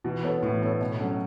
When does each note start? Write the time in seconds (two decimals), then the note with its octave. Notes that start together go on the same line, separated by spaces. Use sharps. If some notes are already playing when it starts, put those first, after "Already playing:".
0.04 B2 E3
0.23 B3 A4 C#5
0.42 A2 E3
0.62 B3 A4 C#5
0.81 B2
1.00 F#3 A3 C#4